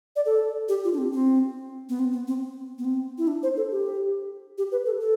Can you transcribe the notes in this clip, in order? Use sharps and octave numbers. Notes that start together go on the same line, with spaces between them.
D5
A4
G4
F4
D4
C4
C4
B3
C4
B3
C4
B3
C4
E4
D4
C5
A4
G4
G4
B4
A4
A4